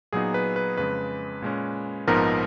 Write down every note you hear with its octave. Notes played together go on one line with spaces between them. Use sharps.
A#2 F#3 B3 D#4 G#4
B4
B4
F2 C#3 G#3 B4
A#2 G#3 C#4
A#1 G#2 F3 B3 D#4 A#4